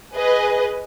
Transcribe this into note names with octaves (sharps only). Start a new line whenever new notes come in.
G#4 B4 D#5